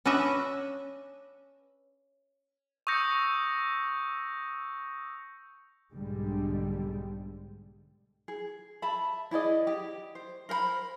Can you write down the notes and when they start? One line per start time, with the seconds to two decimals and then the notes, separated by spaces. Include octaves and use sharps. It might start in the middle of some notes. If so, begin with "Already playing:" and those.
0.05 C#4 D4 B4 D#5 E5
2.87 C#6 D#6 E6 G6 A#6 C#7
5.92 B1 G#2 D3 G3 G#3
8.28 G#4
8.82 E5 A5 B5
9.31 E4 G#4 D5 D#5
9.67 G4
10.15 C5
10.49 A#4 C5 G5 B5